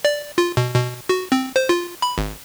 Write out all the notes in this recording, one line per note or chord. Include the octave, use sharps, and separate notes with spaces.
D5
F4
B2
B2
F#4
C4
C5
F4
B5
G#1